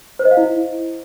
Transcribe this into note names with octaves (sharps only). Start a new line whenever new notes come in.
C5
D#5
F5
E4